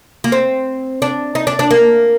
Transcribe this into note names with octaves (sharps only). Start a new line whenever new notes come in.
A#3
C4
D4
D#4
D4
D4
A#3